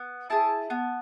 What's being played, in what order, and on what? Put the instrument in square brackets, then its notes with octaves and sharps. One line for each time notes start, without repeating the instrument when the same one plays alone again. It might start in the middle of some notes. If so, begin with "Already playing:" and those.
Already playing: [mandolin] B3
E4 G#4 A5
B3